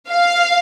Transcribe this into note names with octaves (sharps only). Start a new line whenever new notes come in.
F5